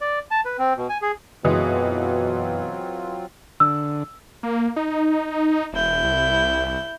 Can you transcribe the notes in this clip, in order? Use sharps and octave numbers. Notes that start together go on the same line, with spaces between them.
D5
A5
B4
C4
B2
G#5
G#4
F#2 B2 E3 F#3 G#3 C4 F4 D#6
D3 E6
A#3
D#4
E1 E4 G6
C2